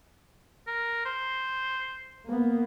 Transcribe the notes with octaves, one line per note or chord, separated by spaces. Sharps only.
A#4
C5
A#3 B3